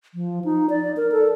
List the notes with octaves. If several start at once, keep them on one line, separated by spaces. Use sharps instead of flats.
F3
D#4
D5
A#4
A4